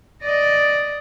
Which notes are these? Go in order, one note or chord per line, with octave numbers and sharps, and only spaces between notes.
D5 D#5